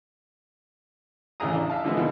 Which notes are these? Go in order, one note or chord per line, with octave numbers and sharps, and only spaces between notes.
A1 C#3 E4 G#4 A#5 D#6
D4
E5 F5 A5
D3 E3 F3 G#3 B3 E4
D#2 B2